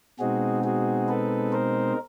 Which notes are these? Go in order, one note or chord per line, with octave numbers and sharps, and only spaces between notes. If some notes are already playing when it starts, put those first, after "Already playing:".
B2 G#3 C4 D#4 F#4 G#4
F#4 G#4
A4 B4
A#4 C5